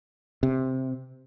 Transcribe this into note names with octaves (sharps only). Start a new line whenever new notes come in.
C3